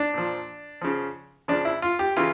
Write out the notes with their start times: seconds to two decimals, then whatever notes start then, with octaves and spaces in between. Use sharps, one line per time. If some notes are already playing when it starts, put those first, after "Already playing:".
Already playing: D4
0.14 A#2 F3
0.82 C#3 F3
1.48 C#3 F3 D4
1.65 E4
1.82 F4
1.99 G4
2.17 C#3 E3 F4